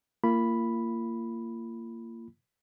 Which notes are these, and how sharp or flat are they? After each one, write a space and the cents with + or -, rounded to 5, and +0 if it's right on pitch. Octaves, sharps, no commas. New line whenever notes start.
A#3 -20 F4 -35 B5 +0